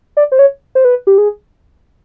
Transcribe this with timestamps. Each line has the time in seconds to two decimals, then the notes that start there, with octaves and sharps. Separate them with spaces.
0.17 D5
0.32 C5
0.39 C#5
0.75 C5
0.85 B4
1.07 G4
1.18 G#4